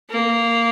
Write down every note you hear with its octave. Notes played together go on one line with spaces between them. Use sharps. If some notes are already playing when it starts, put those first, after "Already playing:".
A#3